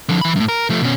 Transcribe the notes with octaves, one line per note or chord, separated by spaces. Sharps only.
D3 F3
E3 B5
F#2 A2
A#4
F3 A3
B2 C#4